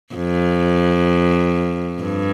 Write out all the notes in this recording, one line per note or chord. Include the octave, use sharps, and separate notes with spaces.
F2
G2